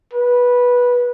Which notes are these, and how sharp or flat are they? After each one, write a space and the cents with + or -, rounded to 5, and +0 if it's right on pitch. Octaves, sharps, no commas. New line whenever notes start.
B4 -15